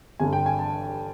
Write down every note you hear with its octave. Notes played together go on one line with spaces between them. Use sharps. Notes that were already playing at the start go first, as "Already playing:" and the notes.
G1 G2 D3 G#5
G5
G#5
A5